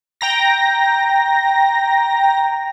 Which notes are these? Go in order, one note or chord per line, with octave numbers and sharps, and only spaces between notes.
G5 A#5 A#6